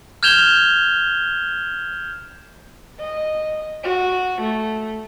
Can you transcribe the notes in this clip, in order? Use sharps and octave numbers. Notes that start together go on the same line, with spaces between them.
F6 G6 G#6 E7 F7 G7
D#5
F#4
A3